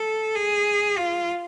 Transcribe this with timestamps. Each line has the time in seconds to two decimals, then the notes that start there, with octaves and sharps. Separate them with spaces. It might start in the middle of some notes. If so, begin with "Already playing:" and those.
Already playing: A4
0.35 G#4
0.98 F4